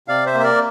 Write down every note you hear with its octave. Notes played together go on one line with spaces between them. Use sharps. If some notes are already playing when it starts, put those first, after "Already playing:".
C3 D5 F5
C5 E5
A#3
E5
A#4 D5